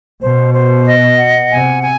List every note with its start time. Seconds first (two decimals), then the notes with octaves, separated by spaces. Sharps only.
0.21 B2 C5
0.53 C5
0.86 D#5
1.18 F#5
1.51 C3 G#5
1.83 G#5